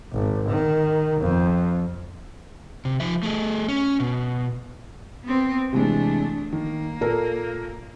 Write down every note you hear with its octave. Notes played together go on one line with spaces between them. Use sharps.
G#1
D#3
F2
C3
F3 E5
A3 G#4
C#4
B2
B3 C4
C3 E3 G#3 A3 D4
D#3 A#3
A#2 A4 A#4